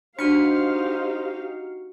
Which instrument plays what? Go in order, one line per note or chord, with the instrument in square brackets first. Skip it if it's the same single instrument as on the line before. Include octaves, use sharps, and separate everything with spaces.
[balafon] D4 [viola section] D#4 G4 F5 [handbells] F#4 F6 C#7 [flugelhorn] C5